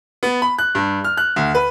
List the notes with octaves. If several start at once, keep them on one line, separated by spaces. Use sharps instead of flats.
B3
B5
F#6
G2
F6
F#6
D2
B4